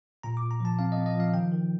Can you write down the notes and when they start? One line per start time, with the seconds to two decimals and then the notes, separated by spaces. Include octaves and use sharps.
0.23 A#2 A#5
0.37 D6
0.42 A#2
0.51 A#5
0.60 F3 A5
0.79 C4 F5
0.92 D#5
0.97 C4
1.06 D#5
1.15 F3 F5
1.34 D#3 G5
1.52 D#3